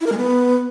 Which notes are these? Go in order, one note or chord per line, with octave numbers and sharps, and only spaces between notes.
E4
A#4
G#3
B3